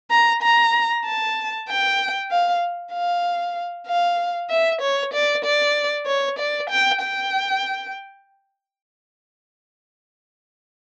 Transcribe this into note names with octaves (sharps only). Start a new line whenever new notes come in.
A#5
A#5
A5
G5
F5
F5
F5
E5
C#5
D5
D5
C#5
D5
G5
G5